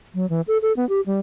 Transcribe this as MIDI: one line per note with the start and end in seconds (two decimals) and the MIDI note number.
0.15 0.28 54
0.30 0.41 52
0.48 0.58 69
0.62 0.73 69
0.77 0.87 59
0.89 1.01 67
1.06 1.20 55